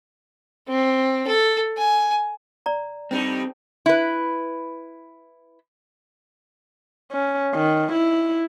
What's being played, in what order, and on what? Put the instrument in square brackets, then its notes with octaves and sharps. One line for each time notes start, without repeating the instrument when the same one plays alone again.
[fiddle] C4
A4
G#5
[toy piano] D5 A#5
[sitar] G2 G3 D#4 [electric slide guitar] C4 A4
[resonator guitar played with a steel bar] E4 B4
[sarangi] C#4
D#3
E4